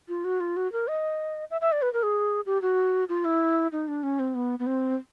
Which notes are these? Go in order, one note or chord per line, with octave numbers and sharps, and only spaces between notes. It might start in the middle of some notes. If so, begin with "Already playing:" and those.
F4
F#4
F4
F#4
A#4
D#5
E5
E5
D5
B4
A#4
G#4
G4
F#4
F4
E4
D#4
D4
C#4
C4
B3
B3
C4